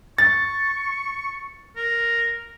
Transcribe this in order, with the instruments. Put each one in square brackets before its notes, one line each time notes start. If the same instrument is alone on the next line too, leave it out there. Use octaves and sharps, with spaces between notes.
[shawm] C#6 [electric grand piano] A6
[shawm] A#4